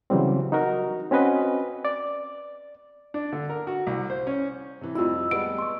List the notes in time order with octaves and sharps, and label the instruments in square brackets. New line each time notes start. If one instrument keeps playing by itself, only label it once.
[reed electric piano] C#3 E3 F#3 G3 C4
D#4 F#4 A#4
C4 C#4 F#4 B4 D#5
D5
[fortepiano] D4
D3
A#4
F#4
C2
C5
C#4
[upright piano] C3 E3
[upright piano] F2 G3 C4 [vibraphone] A3 D#5 E6 [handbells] E4 F4
[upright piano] G3 G#3 B3 [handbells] D7
[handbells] C6 C#6